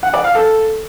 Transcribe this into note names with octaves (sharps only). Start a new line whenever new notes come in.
F#5
D5
F5
A4